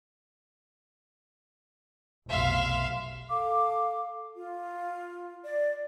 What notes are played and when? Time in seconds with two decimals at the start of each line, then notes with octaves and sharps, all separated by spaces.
2.29 F1 B1 E5 F5 C6
3.29 A4 F5 D6
4.35 F4
5.44 D5